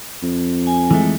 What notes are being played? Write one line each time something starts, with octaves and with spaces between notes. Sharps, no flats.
F2
G#5
E3 G#3 A3